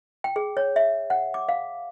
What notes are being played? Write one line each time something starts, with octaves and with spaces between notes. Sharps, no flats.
G5
G#4
C#5
E5
F#5
D6
F5